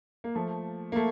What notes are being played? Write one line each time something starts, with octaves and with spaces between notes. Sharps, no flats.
A#3
F3 A3
A#3
A3